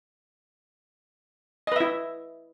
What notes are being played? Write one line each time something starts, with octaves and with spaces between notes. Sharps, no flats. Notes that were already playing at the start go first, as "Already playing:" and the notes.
E4 B4 D#5 E5